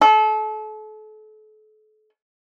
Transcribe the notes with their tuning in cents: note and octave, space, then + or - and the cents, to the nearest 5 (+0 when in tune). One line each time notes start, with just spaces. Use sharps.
A4 -35